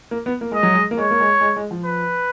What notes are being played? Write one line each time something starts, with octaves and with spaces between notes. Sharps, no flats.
A#3
B3
A#3
G#3 D#5
F#3
G#3
A#3
G#3 C#5
A#3
G#3
G#3
G#3
F3
B4